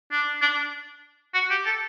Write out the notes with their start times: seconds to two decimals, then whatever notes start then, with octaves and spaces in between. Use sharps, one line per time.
0.11 D4
0.42 D4
1.34 F#4
1.51 G4
1.66 A4